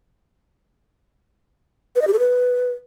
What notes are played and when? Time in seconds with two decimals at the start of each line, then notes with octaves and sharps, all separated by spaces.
1.96 B4
2.01 D#5
2.07 G4
2.13 A4
2.19 B4